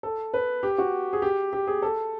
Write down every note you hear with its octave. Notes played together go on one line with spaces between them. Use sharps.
A4
B4
G4
F#4
G#4
G4
G4
G#4
A4